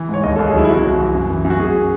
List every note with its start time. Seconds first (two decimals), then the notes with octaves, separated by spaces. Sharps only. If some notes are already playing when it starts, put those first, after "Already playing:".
Already playing: E3
0.09 G#2 C#5
0.24 D#2 D#5
0.35 A4
0.39 D#2
0.46 G#4
0.54 F#3 E4
0.64 E4
0.69 C2 F#4
0.84 C2
0.99 E3
1.14 F#2
1.30 E3
1.45 F#2
1.50 F#4
1.59 F#2 G#4